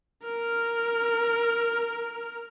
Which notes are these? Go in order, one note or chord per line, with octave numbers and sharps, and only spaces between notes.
A#4 F6